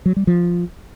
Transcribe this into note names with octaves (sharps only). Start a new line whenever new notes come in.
F#3
G3
F3